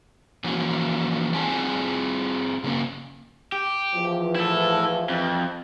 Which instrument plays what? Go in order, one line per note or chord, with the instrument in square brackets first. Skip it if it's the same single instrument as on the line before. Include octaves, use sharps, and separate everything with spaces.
[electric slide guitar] E3 F3 A#3 C#4 E4 F#4
C4 F4 G#4 F#5 G#5 A5
C#3 A#3 C#4
[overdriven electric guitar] G4
[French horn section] E2 E3 F3
[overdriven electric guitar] E4 A4
F2